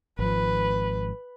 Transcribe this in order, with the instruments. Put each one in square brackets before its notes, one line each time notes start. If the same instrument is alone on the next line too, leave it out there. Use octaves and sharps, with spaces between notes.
[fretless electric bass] G#1 F3 [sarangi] B4